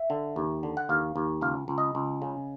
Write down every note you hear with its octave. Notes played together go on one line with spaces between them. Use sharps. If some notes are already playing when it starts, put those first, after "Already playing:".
Already playing: E5
D3
D#2
D3
F#5
D#2 F5
D#2
C#2 F5
C#2
D#5
C#2
C#3